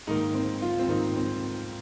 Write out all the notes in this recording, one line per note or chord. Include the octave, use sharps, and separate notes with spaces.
G#2 D#3 A#3 D#4
C4
F4
C4
G#2 D#3 A#3 D#4
C4